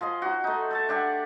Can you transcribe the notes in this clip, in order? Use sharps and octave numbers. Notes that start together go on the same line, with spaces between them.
F3 G#4 D#5 C6
D#4 F#4
A3 D#4
A4 E5 A5
D4 G4 E5 F#5